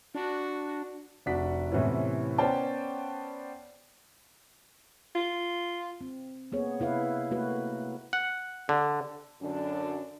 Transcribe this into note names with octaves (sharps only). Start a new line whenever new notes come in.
D4 F#4
F1 D4 F#4 B6
A2 C3 E3 B3 C#4 E4
B3 C#4 C5 D5 G5 A5
F4
C4
A#3 B3 G#4 C#5
C3 E4 B4 F5
A3 A#3 F#4 B4
F#5
D3
F#2 D3 D4